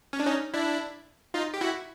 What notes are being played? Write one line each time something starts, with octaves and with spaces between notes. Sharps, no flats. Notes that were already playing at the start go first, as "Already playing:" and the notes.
C#4
D4
C#4 D#4
D4 E4
D#4 F4
G4
E4 F#4